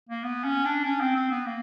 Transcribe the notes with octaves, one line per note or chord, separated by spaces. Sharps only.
A#3
B3
C#4
D4
C#4
C4
C4
B3
A#3